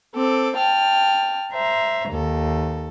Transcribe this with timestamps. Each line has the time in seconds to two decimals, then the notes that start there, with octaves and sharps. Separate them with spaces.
0.14 C4 A4 D6
0.55 G5 A5 F6
1.51 C5 E5 A#5
2.11 D#2 A4